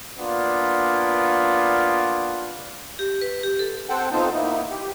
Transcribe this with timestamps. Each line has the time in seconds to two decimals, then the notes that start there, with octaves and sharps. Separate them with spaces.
0.18 A#3 B3 D4 F4
2.99 G4
3.21 B4
3.43 G4
3.59 A4
3.89 C4 A4 C5 F#5 G5
4.12 B3 C4 D#4 F4 A4 C5
4.33 A#3 B3 D#4 E4
4.69 G4